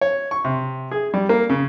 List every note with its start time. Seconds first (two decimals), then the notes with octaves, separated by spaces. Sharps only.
0.01 C#5
0.31 C#6
0.44 C3
0.91 G#4
1.14 G3
1.29 A#3
1.49 C#3